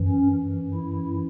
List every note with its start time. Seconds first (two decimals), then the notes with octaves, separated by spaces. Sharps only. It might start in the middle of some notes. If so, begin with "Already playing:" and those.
Already playing: F#2 E3
0.08 C#4
0.74 E4